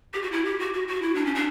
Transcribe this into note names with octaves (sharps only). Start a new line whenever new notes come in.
G4
F#4
E4
G4
F#4
F#4
F#4
E4
D4
C#4
D4